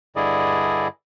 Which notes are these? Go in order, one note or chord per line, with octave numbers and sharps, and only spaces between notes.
G2 D3 E4 G#4 D5 D#5